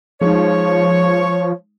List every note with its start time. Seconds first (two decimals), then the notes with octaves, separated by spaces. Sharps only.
0.21 F3 G#3 D#4 C#5